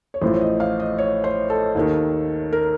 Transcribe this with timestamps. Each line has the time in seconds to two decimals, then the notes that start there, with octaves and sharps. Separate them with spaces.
0.14 C#5
0.21 A1 A2 F3 C5
0.41 D#5
0.60 F5
0.80 D#5
0.98 C#5
1.24 C5
1.50 A4
1.75 D#2 D#3
2.53 A#4